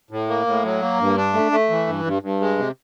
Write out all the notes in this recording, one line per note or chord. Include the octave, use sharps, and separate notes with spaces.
A2
A#3
A2
F#3
A#3
G2
D4
A3
A3
E3
G2
G2
G2
G#3
C3